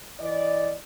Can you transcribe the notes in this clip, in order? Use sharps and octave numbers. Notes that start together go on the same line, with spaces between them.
E3 D5 D#5